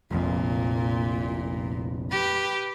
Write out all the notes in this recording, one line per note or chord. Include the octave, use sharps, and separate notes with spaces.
F1 A#1 F2 A#2
G4 B4